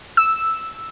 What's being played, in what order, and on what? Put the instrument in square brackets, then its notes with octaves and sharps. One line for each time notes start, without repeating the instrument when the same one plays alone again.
[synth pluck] E6